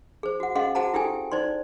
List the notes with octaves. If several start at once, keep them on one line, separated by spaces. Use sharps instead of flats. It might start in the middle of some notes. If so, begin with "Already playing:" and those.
G#4 C5
F#4 F#5
C#4 G#4 D#5 F5 F#5 C6
F#4 G#4 C5 F#5 A5 A#5
E4 G4 A4 G5 G#5
D#4 C5 D5 C6